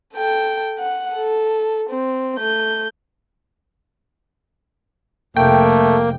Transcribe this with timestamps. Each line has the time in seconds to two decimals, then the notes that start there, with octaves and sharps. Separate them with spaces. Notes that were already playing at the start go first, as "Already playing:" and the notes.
0.14 A4 G5
0.79 F#5
1.13 A4
1.90 C4
2.39 A3 G6
5.37 F1 A3 A#3 G5